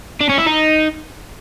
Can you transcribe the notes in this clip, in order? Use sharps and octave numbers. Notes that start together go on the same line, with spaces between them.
D4
C#4
E4
D#4